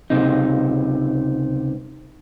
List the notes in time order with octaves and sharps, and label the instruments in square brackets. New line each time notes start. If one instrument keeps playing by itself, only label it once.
[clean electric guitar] C#2 C3 D#4